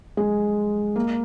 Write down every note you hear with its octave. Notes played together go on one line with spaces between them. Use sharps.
G#3
A#3